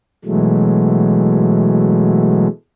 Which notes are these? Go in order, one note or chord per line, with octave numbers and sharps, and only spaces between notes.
B2 E3 F#3 G#3 A3